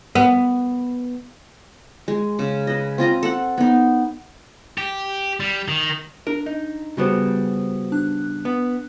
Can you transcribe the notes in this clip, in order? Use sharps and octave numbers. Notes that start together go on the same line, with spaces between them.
B3
G#3
C#3
B4 D#5
C4 F4 D#5 A#5
A4 F#5
B3 D#4
G4
G3
D#3
D4 A#4
D#4
C#3 G3 B3 F#4 C5
D4 F#6
B3